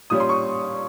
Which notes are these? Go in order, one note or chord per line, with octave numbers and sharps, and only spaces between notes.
A#2 G3 C#4 D#6
C6
C#6